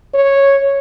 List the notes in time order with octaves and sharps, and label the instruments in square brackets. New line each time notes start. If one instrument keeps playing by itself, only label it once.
[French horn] C#5